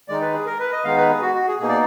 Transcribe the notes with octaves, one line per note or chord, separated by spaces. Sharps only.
D#3 G#3 D#4 D5
B4
G#4
A#4
B4
D#5
D#3 G#3 B3 D#4 F5
B4
G#4
F#4
F#4
G#4
B2 A#3 D#4 G#4
D5